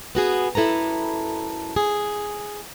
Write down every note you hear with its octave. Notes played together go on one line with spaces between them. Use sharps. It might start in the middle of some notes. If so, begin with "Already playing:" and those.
B3 F#4 G#4
F#2 E4 A4 B4 A#5
G#4